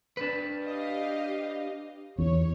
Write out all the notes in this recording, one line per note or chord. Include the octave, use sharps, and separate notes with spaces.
D4 B4
G4 D#5 F5
E2 C#5